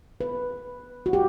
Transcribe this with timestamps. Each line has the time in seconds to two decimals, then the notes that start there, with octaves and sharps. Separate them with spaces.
0.21 B4
1.06 F#4
1.13 G4